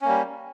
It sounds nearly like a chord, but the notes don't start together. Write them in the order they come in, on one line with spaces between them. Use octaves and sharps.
C#4 A#3 G3